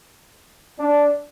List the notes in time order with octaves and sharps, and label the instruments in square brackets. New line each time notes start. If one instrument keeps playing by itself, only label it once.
[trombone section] D4